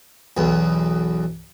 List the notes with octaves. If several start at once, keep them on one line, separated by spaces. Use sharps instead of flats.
B1 E2